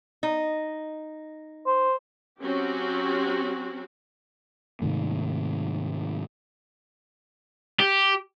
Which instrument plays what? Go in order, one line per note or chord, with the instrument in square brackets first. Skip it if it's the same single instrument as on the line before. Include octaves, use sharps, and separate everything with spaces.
[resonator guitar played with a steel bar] D#4
[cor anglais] C5
[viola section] F#3 C4 C#4 F#4 G4
[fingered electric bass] G#2 C3 D#3 A3
[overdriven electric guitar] G4